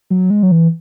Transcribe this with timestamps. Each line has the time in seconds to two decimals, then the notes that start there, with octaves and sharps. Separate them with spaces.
0.10 F#3
0.30 G#3
0.43 F#3
0.51 E3